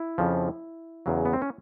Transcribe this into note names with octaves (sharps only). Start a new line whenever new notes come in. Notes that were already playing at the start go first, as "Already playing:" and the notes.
Already playing: E4
F2 C#3 F3
E2 C#3 F#3
B3
C4
C#4